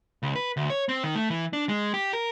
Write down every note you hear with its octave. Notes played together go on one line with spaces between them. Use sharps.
C#2
B4
D2
C#5
C4
D#3
A3
E3
D4
G#3
G4
A#4